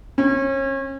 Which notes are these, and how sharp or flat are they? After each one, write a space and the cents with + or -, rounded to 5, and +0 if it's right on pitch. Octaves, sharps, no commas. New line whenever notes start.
C#4 -35